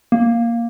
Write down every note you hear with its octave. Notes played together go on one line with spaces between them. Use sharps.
A#3